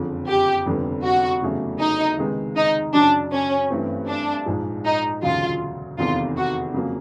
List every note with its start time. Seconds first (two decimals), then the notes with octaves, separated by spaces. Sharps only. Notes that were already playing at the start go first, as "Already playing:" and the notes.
Already playing: F#1 F2 D3 F3
0.28 G4
0.66 F1 F2 D3 G3 B3
1.04 F#4
1.42 F1 E2 C#3 F#3 A3
1.80 D#4
2.18 C#2 C3 D#3 G#3 B3
2.56 D#4
2.94 F#2 C#3 F#3 D4
3.32 C#4
3.70 G2 E3 A3 C4
4.08 D4
4.46 A#1 G#2 F3 G#3
4.85 D#4
5.22 E1 D2 C#3 F#3 F4
5.99 F1 E2 C3 D#3 F4
6.37 F#4
6.74 F2 C#3 F#3 A#3